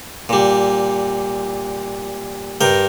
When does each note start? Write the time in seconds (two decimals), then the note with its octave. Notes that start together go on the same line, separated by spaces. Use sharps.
0.29 A#2 G3
2.61 G2 A#4 G5